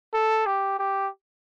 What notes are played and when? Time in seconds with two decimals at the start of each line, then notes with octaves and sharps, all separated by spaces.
0.14 A4
0.46 G4
0.79 G4